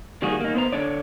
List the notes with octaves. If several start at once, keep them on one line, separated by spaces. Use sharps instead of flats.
D#3 G3 A#3 F#4 G#4
A#3 D#4
B3 C5 A#5
D3 D4 C#5 D5